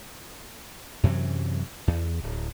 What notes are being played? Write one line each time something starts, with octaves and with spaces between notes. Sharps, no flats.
F#2 C3 E3 F#3
E2
D1